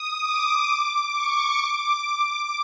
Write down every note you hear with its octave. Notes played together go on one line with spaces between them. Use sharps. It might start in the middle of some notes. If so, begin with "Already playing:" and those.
Already playing: D#6
D6
D6
C#6
D6